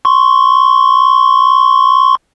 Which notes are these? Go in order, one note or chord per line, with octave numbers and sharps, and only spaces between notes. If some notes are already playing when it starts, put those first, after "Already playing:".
C6 C#6